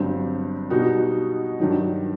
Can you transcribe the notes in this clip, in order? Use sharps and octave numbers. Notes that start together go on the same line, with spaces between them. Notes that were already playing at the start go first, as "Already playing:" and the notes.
Already playing: G1 G2 F#3 C4
B2 G3 D#4 F#4
G2 D#3 F#3